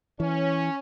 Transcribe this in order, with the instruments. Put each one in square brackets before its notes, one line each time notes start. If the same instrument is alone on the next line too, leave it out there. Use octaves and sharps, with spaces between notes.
[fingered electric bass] E3 [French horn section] C#4